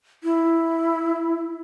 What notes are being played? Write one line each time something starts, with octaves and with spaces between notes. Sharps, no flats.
E4